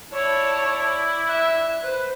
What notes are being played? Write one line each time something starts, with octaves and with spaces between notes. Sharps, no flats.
E4 C#5 D5 A5
E5 F#6
B4 C5